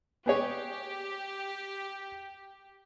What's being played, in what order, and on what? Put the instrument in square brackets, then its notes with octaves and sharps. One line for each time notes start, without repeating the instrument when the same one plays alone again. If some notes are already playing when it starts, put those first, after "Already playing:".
[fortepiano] B3 G#4 C#5 [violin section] G4